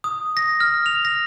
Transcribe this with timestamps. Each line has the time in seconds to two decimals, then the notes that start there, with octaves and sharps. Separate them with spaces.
0.04 D#6
0.37 A#6
0.60 F6
0.86 F7
1.05 A#6